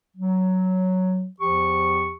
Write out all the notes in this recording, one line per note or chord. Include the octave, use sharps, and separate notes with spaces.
F#3
E2 F3 G4 C#6